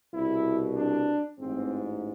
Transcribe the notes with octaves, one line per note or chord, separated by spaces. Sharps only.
C2 B2 E4
D4
A1 G#2 E3 C4